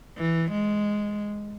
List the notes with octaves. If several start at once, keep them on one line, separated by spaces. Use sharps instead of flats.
E3
G#3